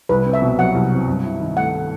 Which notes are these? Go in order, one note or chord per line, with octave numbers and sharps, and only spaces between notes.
C2 B4
C4
E5
B2
F#3 F#5
C2
C4
G2
E4
D#3
A3 F#5